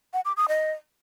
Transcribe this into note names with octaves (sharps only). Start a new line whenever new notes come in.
F#5
D6
D#6
D#5